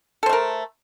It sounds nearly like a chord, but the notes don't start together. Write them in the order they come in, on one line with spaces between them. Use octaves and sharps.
A4 C5 A3 A#4